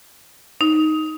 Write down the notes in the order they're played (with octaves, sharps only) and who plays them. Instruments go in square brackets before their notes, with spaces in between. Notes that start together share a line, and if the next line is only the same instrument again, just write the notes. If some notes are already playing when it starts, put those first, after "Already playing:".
[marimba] D#4